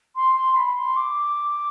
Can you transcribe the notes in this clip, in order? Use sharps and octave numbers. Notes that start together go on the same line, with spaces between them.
C6
C6
B5
C6
D6